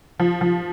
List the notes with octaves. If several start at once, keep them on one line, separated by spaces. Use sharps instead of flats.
F3
F3